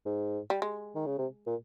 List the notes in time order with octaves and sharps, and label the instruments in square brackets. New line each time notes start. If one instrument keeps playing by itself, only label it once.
[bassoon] G#2
[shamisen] G3
G#3
[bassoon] D#3
C#3
C3
A#2